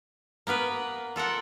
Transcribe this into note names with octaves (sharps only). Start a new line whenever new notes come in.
A#3 B3 A#4 B4
F4 A4 A#4 F#5